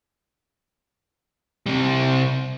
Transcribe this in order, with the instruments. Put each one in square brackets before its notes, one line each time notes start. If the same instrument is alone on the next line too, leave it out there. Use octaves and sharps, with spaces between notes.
[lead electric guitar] C3 G3